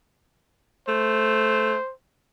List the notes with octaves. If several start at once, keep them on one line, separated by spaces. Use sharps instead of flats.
A3 C5